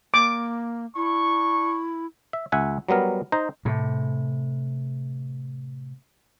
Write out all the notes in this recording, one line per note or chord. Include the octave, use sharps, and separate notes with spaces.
A#3 D6
D4 E4 C#6
E5
C#2 E5 F#5 G#5
F#3 G3 B3 A#4
D#4 C5 A#5
A2 C3